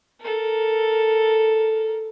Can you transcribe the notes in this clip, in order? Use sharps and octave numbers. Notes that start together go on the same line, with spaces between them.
A4 A#4